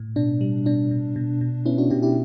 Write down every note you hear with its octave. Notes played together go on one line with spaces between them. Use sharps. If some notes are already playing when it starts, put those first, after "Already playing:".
Already playing: A2
B2 D4
G3
B2 D4
B2
B2
B2
B3 C#4 E4
D4 F#4
B2 E4 G4
E4 G4